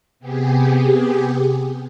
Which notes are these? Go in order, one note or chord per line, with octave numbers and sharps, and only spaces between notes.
C3 B3 G4 G#4